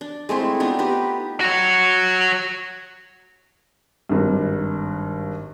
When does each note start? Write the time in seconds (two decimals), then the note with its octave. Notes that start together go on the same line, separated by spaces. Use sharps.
0.01 D4
0.29 G#3 A3 C4 E4
0.60 B3 D4 D#4 F4
0.79 D#4 G4 B4
1.41 F#4 C#5
4.09 G#1 G2